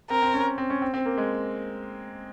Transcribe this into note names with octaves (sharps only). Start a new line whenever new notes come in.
C4 A#4
C4
C#4
C4
C#4
C4
C4
A#3
G#3